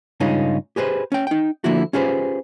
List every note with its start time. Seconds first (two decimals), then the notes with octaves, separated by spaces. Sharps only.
0.20 G2 C#3 G#3 C#4 D#4 F4
0.76 G4 G#4 B4 C5
1.12 C#4 G5
1.27 D#4 G5
1.64 D3 F3 A#3 E4 F#4
1.93 C#4 F4 G4 G#4 B4 C5